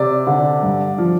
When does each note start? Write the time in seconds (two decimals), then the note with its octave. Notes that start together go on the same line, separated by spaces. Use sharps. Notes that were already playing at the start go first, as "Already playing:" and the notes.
Already playing: C3 D5
0.27 D3
0.63 G2
0.98 F3